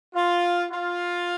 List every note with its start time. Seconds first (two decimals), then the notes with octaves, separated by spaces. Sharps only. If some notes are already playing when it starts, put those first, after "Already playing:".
0.16 F4
0.72 F4